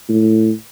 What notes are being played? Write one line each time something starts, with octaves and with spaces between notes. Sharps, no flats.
A2